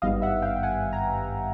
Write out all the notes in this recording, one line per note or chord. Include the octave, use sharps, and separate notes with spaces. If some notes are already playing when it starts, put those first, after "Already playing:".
G#1 G2 D#3 G3 B3 D#5 F5
E5 F#5
F5 G5
G5
F#5 G#5
G#5 A#5